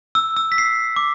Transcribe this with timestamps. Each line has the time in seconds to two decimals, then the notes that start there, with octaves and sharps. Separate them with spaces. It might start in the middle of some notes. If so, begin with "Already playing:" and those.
0.15 E6
0.36 E6
0.52 B6
0.58 C7
0.96 D6